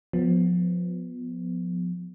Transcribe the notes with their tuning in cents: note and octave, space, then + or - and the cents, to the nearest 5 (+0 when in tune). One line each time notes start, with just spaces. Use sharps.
F3 +25 B3 +0